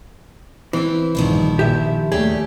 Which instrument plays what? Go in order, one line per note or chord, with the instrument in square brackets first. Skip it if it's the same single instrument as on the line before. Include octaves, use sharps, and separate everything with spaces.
[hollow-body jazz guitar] E3 [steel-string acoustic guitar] C4 E4
[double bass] A#1 G2 [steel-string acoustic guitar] D#3 F3 E4
[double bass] A#2 [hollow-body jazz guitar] G4 E5
[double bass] D#2 A3 [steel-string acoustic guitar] C#4 G4 D5 [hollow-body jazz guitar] G#4